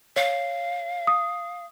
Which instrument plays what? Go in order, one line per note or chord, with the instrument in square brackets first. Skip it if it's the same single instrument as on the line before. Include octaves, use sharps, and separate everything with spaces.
[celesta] C#5 [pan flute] F5
[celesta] D#6